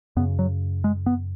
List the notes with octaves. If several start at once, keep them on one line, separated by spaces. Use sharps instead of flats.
F#2 C#3 B3
F#3
G#3
B3